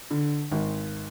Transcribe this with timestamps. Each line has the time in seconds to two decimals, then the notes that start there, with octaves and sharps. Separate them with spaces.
0.11 D3
0.51 G#1